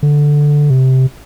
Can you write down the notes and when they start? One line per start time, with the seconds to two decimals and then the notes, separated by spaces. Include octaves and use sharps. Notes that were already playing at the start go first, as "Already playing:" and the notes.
0.03 D3
0.70 C3